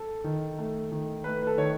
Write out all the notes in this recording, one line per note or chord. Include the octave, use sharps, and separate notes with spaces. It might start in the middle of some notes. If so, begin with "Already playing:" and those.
Already playing: A4
D#3
A3
D#3
A3 B4
B4
A4
D#3 C#5